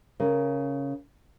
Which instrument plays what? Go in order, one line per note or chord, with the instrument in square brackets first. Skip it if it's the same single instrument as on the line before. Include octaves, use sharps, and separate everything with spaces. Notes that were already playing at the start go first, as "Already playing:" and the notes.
[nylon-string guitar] C#3 A#4